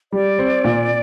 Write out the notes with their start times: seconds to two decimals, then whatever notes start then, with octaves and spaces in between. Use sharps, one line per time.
0.12 G3 D5
0.39 C4
0.64 A#2